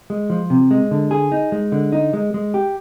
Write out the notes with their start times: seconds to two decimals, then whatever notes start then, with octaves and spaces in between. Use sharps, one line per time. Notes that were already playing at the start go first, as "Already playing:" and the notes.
0.10 G#3
0.30 F3
0.50 C3
0.71 G#3
0.91 D3
1.11 G#4
1.32 D#4
1.52 G#3
1.72 D3
1.92 D#4
2.13 G#3
2.34 G#3
2.54 G4